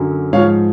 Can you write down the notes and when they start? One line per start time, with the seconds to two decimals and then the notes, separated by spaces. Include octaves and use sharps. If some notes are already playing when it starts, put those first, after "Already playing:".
Already playing: F#2 D3 F#3
0.33 G#2 F3 C#5 F5